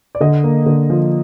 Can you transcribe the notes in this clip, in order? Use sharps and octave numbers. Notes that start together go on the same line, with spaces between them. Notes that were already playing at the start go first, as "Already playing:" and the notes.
D5
D3 D#5
A#3
D3
F3